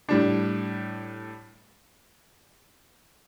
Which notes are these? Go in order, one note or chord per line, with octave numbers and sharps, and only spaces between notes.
A2 G3 D4